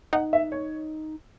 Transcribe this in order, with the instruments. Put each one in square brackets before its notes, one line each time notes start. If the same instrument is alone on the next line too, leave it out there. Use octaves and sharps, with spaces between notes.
[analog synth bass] D#4 [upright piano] F#5
[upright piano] E5
C#5